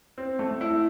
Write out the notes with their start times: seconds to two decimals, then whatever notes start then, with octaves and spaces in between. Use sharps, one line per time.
0.18 C4
0.39 A3
0.61 E4